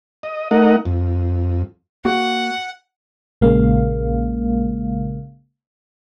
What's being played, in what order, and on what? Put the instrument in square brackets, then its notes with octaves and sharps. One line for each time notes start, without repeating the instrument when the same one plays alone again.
[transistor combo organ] D#5
A3 D#4 A#4 D#5 F#5
F2
[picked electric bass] A#3 [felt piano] F#4 [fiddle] F#5
[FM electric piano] A#1 C#3 G#3 A#3 F5